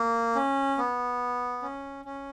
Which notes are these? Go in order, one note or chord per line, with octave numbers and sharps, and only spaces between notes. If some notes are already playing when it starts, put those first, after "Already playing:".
Already playing: A#3
C#4
B3
C#4
C#4